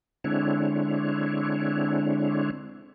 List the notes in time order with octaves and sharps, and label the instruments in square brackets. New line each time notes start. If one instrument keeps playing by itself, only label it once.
[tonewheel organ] D3 G#3 C4 D4 E4 C#5